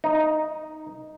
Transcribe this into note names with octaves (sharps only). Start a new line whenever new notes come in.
D#4